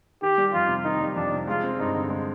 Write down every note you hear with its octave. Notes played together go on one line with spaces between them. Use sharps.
D#3 G4
G3
F2 F4
C3
D#3 D#4
G3
F2 D4
C3
G#3 F4
C4
G2 D#4
D3
G#3